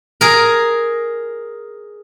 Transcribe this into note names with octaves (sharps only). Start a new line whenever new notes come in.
G#4 A#4